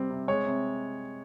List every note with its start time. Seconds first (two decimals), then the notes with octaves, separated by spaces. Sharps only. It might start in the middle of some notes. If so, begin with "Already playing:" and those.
Already playing: C3 G3 C4
0.10 C3
0.28 G#3 C#5
0.46 C3